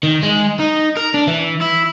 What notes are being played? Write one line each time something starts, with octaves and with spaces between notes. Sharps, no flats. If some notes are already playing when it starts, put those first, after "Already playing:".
D#3
G#3
D#4
A#4
D4
E3
E4